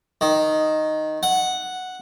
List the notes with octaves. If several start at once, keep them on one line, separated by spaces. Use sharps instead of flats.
D#3
F#5